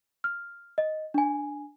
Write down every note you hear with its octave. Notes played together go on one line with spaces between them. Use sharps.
F6
D#5
D4 G#5